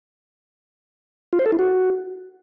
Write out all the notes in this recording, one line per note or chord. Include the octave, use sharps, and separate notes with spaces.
F4
C5
A4
E4
F#4